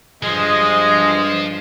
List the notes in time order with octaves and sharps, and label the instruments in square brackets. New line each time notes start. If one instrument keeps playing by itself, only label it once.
[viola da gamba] G2 C5 [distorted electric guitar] F3 [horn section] G#3 [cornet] D#5